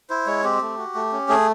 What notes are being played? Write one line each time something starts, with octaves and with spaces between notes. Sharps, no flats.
E4 C5
G#3 C#5
C4 G4
A3
F#4
A3
C#4
A3 G#4